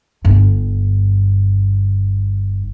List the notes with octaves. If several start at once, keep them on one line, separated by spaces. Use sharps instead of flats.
G1 G2